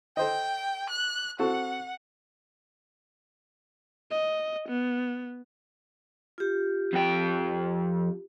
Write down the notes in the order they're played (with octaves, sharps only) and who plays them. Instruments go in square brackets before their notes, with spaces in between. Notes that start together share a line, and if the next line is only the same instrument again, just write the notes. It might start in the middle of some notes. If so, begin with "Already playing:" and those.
[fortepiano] A4 C5 D#5 [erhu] G5
[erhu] F#6
[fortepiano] C4 F#4 A4 [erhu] F#5
[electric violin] D#5
B3
[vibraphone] F4 G4
[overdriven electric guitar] F2 G5